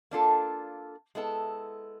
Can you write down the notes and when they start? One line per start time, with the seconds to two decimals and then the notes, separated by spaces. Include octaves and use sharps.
0.11 A#3 D4 F4 A4
1.15 G#3 B3 E4 A4